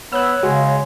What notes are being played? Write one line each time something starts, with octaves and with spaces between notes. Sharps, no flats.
B3 C#5 E6 F#6
C#3 G#3 F#4